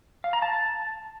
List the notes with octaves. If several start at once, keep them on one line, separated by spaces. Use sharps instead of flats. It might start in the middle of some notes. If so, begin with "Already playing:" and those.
F5
A#5
A5